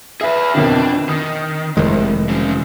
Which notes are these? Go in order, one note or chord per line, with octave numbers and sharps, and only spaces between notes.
G#4 B4 E5
F2 B2 D#3 D4
D#3 D#6
F1 C2 D#3 G#3
C#3 F#3